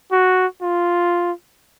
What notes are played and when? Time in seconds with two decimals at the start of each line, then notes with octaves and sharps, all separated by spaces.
0.12 F#4
0.62 F4